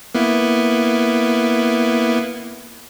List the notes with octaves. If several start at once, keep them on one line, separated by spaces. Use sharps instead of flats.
A#3 B3 E4